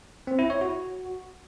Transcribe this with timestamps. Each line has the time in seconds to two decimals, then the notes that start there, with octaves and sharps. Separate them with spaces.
0.27 C4
0.39 E4
0.50 C#5
0.61 F#4